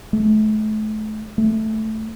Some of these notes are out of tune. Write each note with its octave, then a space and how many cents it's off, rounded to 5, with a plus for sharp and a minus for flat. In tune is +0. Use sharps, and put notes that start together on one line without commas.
A3 -35
A3 +0